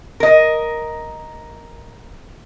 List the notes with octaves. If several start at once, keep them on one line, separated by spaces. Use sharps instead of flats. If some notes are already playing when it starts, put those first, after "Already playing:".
A#4 D#5